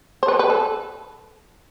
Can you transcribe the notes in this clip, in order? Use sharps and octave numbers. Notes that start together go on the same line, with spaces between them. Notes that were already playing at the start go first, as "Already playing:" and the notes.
C5
B4
B4
A4